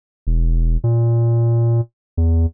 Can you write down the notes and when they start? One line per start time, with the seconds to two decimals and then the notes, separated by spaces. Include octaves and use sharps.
0.27 E1
0.84 A#2
2.17 E2